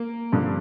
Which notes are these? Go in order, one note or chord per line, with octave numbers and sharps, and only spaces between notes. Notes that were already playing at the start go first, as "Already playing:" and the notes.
Already playing: A#3
G2 D3 F3